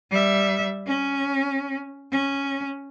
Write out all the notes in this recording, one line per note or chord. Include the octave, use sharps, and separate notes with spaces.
G3 E5
C#4
C#4